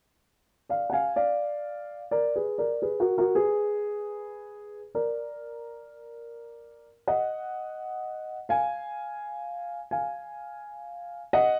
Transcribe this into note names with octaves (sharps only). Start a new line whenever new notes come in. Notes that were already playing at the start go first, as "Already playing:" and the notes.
D5 F5
F#5
F5 G#5
D5 F5
A#4 D5
G#4 B4
A#4 D5
G#4 B4
F#4 A#4
F#4 A#4
G#4 B4
A#4 D5
D#5 F#5
F5 G#5
F5 G#5
D#5 F#5